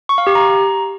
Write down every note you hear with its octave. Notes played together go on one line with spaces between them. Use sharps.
C#6
F5
G4
A#5